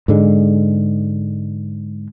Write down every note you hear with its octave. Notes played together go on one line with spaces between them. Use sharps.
G#2 D3 G#3